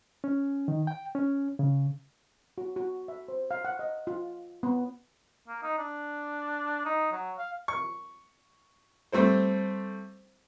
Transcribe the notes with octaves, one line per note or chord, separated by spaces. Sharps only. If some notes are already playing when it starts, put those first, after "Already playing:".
C#4
D#3
G5
C#4
C#3
F#4
F#4
E5
C5
F5
F#5
D#5
F4
B3
A#3
D#4
D4
D#4
F#3
F5
C#6
G3 A3 C4 C5